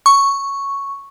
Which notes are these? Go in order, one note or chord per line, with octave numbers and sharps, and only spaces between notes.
C#6